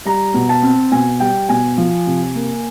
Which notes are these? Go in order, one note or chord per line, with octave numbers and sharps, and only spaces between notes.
G3 A#5
B2
A5
C4
B2 G#5
G3 G5
B2 G#5
F3
C3
A#3